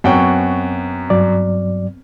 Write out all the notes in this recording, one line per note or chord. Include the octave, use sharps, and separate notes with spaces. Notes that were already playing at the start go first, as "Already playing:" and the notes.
F#2 B3 C4 C#5 F#5 G5
G2 F#3 D5